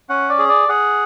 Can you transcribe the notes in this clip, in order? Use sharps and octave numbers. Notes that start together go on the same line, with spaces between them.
C#4 F#5
D5
G#4
D5
G#4 F#5